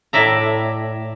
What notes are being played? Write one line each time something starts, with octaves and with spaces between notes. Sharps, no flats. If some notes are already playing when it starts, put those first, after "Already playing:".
A2 D5 E5 A#5